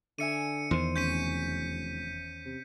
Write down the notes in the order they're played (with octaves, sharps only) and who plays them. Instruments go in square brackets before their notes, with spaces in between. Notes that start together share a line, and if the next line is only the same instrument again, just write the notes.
[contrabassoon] D3 [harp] D5 E5 G#5 [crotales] C#7 D#7
[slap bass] E2 D#3 [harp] C5
[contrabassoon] F1 [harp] C#4 [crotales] G6 B6 D#7
[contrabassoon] C3